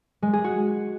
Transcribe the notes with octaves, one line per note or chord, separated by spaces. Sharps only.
G#3
G#4
F#4